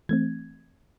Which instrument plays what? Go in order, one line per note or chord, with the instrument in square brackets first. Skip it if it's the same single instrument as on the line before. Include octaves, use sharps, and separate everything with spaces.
[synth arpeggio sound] E3 A3 C4 G#6